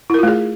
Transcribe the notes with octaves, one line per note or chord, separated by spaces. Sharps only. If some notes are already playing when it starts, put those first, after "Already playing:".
A3 E4 F4 G#4 A#4